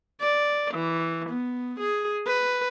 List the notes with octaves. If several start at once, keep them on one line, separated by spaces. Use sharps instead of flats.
D5
E3
B3
G#4
B4